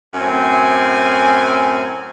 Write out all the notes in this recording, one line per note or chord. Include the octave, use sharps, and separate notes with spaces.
F#2 A2 C4 G#5